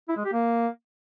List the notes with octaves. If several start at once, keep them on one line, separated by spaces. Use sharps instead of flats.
E4
G#3
G4
A#3